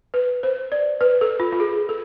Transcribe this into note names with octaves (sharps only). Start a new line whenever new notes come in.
B4
C5
D5
B4
A4
F4
F4
G#4
A4